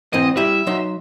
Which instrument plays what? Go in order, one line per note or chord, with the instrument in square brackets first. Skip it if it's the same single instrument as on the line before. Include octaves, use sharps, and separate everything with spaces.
[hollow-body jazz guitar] G#2 E3 C4 [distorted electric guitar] D#5
[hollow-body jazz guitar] G3 E4 G4 [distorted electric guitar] E5
[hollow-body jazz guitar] F#3 D#4 C6